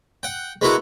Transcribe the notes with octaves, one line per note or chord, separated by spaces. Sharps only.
F#5 G5
G#3 B3 E4 F#4 A#4 F#5